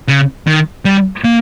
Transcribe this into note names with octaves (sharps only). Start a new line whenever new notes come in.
C#3
D#3
G3
A#3